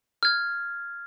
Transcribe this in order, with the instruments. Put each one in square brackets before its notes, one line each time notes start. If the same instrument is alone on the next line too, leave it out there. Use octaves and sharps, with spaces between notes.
[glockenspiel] F6 G#6